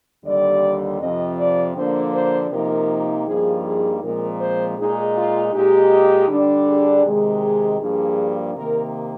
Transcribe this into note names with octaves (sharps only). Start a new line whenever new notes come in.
D#2 D3 G3 D5
F2 C3 F3 C4 D#5
D5
D3 F3 A#3 D4 C5
C5
C3 F3 A#3 D#4 A#4
G2 F3 A#3 D#4 G#4
G#4
A#2 F3 G#3 C4 A#4
C5
A#2 G#3 D#4 G#4
F4
A#2 G#3 D#4 G4
D3 G3 D4
G#4
C3 D#3 G#3
G#4
G2 F3 A#3 D4 G#4
C3 D#3 A#3 A#4